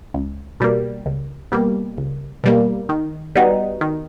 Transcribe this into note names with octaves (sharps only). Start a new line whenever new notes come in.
C#2
B2 G3 A#3
C#2
B2 G3 A#3
C#2
B2 G3 A#3
D#3
G3 B3 D#4 F#4
D#3